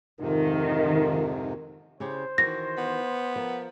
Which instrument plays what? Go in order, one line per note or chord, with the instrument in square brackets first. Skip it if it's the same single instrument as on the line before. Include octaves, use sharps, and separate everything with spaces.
[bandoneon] F2 G#2 C3 [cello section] D#3 [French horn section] F4 A#4
[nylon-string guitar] C#3 E4 G4 [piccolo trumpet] C5
[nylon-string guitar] D#3 E3 F#4 [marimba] A#6
[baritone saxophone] B3
[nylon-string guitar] F3 A#4